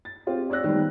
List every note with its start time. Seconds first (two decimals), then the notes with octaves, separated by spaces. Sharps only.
0.05 A6
0.27 C4 F4 G4
0.50 C#5 D5 E6 F#6 A#6
0.64 D#3 G3 B3